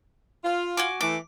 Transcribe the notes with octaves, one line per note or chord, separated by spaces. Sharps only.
F4
F#4 G#5 D6
E3 A3 D6